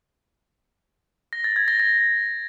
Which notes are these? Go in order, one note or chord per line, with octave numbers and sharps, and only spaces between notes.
A#6
A6
G#6
A#6
A#6